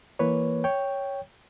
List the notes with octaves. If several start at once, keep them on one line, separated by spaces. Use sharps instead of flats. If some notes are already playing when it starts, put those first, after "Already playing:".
E3 A#3 B4 C#5
C#5 G5